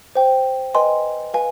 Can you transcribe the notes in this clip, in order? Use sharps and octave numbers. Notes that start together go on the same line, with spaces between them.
C5 G5
B4 D#5 G5 G#5 C6
B4 F5 G#5